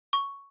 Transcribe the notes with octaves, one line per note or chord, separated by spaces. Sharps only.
C#6